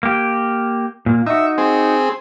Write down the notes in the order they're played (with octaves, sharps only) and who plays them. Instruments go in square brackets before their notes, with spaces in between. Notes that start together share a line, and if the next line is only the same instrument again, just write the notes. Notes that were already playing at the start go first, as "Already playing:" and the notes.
[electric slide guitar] A#3 G4
A#2 A#3
[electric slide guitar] D#4 F#4 [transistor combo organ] E5
[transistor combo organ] C4 G#4